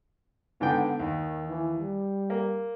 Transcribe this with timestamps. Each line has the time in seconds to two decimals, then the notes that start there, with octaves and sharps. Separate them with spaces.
0.61 G#2 D3 B3 G5
1.00 D#2 D#3
1.49 E3
1.80 G3
2.30 A#3